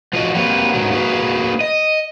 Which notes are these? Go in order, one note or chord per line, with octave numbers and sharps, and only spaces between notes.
F3 F4 F#4 D#5
F#3 A#3 C4 G4 B4 C#5
G#2 B2 D#3 F#3
A#3 F#4 G#4 B4
D#5